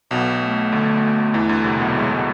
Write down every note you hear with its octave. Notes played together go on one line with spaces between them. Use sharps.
B1 B2 B3
A3
D2 D3
E2 E3
D2 D3
C2 C3
B1 B2
A2 G#3